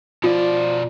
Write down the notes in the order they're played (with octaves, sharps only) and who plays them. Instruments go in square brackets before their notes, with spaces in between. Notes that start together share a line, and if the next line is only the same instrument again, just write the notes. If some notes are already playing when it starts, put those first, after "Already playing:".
[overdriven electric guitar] B2 D5 [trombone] F3 [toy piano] F4